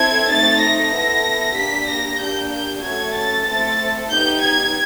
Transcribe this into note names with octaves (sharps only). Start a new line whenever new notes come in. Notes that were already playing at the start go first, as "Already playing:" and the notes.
Already playing: C4 E4 A4 G#6
A3 C4 D#4 A6
A#6
B3 E4 A4
A#3 D4 G4 B6
A#6
A#3 D4 G4 G6
G6
A3 C#4 F#4 A4 G#6
A6
A3 C4 E4 A4 A6
B3 D#4 G4 G6
G#6